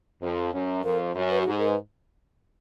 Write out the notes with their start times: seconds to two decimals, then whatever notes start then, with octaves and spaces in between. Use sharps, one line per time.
0.22 F2
0.53 F#2
0.84 F2 A#4
1.15 F#2
1.30 B4
1.42 F#4
1.46 G#2 G#4
1.59 A#4
1.68 B4